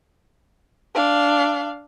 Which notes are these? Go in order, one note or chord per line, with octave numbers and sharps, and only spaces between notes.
D4 F5